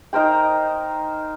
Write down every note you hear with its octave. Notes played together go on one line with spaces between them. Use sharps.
D#4 A#4 C5 G5